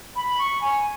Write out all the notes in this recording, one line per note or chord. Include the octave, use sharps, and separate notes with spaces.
B5
C#6
G#5